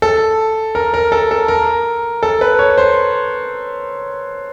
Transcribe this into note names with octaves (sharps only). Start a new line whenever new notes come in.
A4
A#4
A#4
A4
A4
A#4
A4
B4
C#5
C5